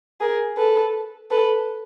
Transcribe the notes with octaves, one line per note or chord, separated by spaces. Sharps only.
G#4 A#4
A4 B4
A4 B4